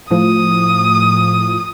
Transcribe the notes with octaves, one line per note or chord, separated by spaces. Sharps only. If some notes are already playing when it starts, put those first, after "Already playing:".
A2 F3 D#6